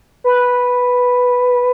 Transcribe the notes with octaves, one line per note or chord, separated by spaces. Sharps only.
B4